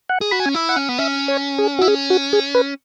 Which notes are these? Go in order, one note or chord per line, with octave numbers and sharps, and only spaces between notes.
F#5
G#4
F#4 B5
G#5
C#4
E4
F#5
C#4
B3
C#4 E5
C#5
G#4
E4 F#4
C#4 G#4
F#4
G#4
B4